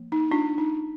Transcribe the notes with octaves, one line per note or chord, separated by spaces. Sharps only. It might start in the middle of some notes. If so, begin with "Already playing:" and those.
Already playing: F3 A#3
D#4
D4 F4
D#4